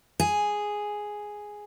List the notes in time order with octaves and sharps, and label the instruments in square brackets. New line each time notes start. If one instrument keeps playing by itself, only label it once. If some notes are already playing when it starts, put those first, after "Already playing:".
[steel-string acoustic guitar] G#4